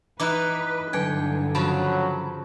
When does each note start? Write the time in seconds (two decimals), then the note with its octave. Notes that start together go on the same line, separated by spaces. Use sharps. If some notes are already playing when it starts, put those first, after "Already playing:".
0.20 E3 D#4 E4 B4 D6 F#6
0.93 G2 D3 F#3 G5 G#5 G#6
1.55 C#3 F3 F#3 A5 B5